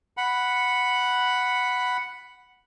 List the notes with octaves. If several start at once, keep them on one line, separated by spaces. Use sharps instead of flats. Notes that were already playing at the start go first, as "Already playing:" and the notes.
F#5 B5